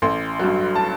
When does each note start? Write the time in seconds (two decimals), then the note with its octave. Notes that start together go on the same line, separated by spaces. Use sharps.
0.02 A1 C6
0.39 G2 F#3
0.75 A5